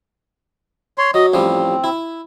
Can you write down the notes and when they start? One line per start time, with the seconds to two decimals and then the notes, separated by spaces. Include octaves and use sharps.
0.98 C#5 C6
1.14 F#3 D#5
1.34 A1 F3 G3 C4
1.84 E4